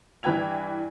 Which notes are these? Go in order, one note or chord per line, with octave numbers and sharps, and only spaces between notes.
G2 E3 B4 G5 G#6 F7